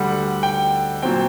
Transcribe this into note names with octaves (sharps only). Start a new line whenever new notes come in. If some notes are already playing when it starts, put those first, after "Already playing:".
Already playing: D2 D3 G3 F#5
G5
A#2 F#3 C4 G5